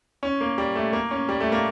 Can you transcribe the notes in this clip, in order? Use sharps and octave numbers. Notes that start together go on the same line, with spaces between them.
C#4
A#3
G3
A3
A#3
C#4
G3
A3
A#3